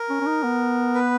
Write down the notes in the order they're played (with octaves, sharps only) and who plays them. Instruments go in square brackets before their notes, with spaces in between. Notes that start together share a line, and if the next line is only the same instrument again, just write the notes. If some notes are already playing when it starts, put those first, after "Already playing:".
Already playing: [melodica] A#4
[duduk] C#4
C#4
D#4
B3
[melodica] B4